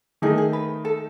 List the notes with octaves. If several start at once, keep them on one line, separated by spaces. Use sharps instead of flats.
D#3 A3 D#4 G#4
G#4
B4
A4